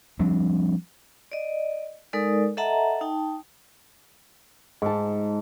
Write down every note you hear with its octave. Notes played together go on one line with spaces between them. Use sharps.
F3 G3 C4 D4
D5 D#5
G#3 D#4 A4 A#4 D5 D#6
A4 D#5 E5 F#5 A5 A#5
D#4 G5 A5
G#2 A5